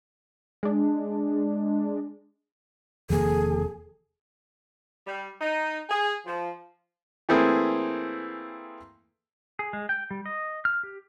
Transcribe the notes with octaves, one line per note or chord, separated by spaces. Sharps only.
G#3 D4
E1 E2 C3 D#3 F3 A#3 G#4 A4
G3
D#4
G#4
F3
E3 A3 A#3 C4 E4 G#4
G#4
G#3
G5
G3
D#5
F6
G4